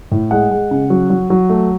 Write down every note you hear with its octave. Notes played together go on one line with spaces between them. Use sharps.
A2
G#3 F#5
G#3
C#3
F#3
F#3
F#3
A3